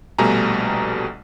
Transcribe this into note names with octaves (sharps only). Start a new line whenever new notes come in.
A#1 B2 G3 A3 G#5 A#5